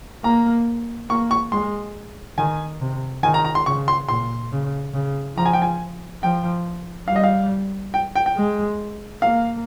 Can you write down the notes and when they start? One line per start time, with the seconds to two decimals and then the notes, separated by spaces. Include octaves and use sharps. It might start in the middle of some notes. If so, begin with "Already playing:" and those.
0.24 A#3 A#5
1.10 A#3 C#6
1.31 C#6
1.52 G#3 C6
2.38 D#3 G#5
2.81 C3
3.23 D#3 G#5
3.34 A#5
3.45 A#5
3.55 C6
3.66 C#3 C#6
3.88 C6
4.09 A#2 C6
4.52 C#3
4.94 C#3
5.37 F3 A#5
5.46 G#5
5.53 G5
5.62 G#5
6.22 F3 G5
7.08 G3 F5
7.16 D#5
7.24 F5
7.94 G5
8.16 G5
8.26 G5
8.37 G#3
9.22 A#3 F5